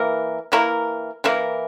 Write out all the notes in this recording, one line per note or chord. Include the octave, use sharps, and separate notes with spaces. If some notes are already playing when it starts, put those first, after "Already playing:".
Already playing: E3 A#3 E4 A#4
E3 A#3 E4 A#4
E3 A#3 E4 A#4